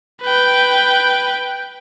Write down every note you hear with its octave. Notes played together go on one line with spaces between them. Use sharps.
B4 G5